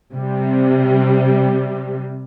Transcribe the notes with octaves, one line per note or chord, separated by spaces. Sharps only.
C3 G3